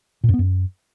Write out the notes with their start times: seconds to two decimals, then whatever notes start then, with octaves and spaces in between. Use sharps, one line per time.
0.24 A#2
0.29 F#2
0.34 B3
0.39 F#2